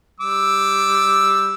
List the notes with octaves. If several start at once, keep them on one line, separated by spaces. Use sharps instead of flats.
G3 D6 E6